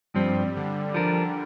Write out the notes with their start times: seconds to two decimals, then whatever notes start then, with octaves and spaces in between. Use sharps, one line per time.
0.15 G2 F3 G3 C4
0.55 D3
0.94 F3 D4 A#4